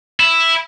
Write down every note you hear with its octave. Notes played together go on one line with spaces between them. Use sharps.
E4